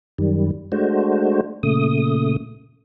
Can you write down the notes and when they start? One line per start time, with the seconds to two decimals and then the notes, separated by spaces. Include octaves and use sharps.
0.18 F#2 D#3 G3
0.72 G#3 A3 D4 F#4 C5
1.63 A#2 C#3 A3 D#6